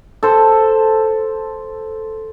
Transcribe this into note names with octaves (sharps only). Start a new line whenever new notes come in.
A4 C5